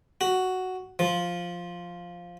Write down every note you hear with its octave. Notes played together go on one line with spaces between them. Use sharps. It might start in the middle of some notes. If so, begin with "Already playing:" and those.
F#4
F3